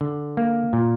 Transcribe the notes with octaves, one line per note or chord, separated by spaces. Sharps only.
D3
A#3
A#2